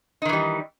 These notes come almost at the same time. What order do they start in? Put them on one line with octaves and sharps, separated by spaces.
D#4 D#3 E3 G3